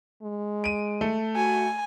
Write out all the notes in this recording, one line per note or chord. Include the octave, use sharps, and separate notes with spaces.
G#3
D7 D#7
A3
F#4 G#5